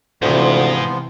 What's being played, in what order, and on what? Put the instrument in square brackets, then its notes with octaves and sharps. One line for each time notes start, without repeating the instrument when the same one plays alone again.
[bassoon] D2 [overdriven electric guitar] G#2 [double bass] C3 E3 [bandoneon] F3 B3 F4